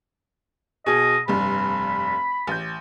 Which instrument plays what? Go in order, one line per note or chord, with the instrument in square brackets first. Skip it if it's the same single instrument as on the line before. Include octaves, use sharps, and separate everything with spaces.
[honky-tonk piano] B2 G#4 [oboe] D#5
[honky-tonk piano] F1 G2 [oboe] B5
[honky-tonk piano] A1 G6